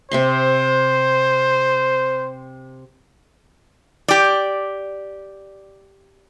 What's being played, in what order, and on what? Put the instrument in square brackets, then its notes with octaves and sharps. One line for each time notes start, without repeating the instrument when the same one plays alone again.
[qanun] C3 E5 C6 [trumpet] C5
[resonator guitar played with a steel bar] G4 D5